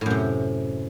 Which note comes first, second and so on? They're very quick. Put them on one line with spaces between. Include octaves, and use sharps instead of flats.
A2 F#2 C3